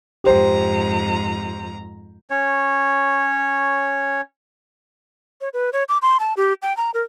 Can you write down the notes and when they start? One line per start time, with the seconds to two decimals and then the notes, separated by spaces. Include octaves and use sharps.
0.24 F2 G#2 G4 C5 A#5
2.30 C#4 C#5
5.41 C#5
5.53 B4
5.73 C#5
5.89 D6
6.02 C6
6.20 A5
6.37 G4
6.62 G5
6.77 A#5
6.94 A#4